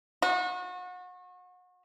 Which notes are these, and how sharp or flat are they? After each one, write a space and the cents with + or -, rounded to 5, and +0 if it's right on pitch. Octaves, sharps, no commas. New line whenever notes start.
F#4 -35